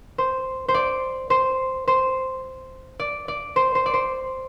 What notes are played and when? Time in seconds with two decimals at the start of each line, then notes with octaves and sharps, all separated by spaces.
0.18 C5
0.68 C5
0.74 D5
1.30 C5
1.88 C5
3.00 D5
3.28 D5
3.56 C5
3.75 C5
3.86 D5
3.94 C5